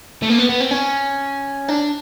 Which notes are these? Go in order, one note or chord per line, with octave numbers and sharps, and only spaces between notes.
A3
A#3
B3
B3
C4
C#4
D4